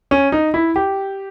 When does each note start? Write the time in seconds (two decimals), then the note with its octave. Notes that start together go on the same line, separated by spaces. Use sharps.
0.11 C#4
0.32 D#4
0.54 E4
0.76 G4